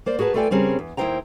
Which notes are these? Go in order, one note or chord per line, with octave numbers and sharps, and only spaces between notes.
A#3 C5 D5
F#4 G#4 A#4 B4 A5
A3 F4 A4 D5 G5 G#5
C#3 G3 C4 C#4 G#4 A#4
E2
D#2 G#2 E4 C5 G5 A#5